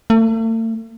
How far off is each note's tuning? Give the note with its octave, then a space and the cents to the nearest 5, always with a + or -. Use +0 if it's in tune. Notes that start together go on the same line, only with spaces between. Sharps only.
A3 +40